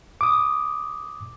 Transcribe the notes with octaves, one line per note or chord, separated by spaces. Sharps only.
D6 D#6